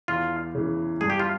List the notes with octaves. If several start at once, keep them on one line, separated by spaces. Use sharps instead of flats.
E2 F4
C#3 E3
G2 G#4
G4
F4